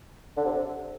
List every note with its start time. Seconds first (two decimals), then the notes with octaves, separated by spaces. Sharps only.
0.37 D3
0.45 C3